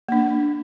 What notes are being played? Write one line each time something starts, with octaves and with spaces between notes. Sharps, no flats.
A#3 D4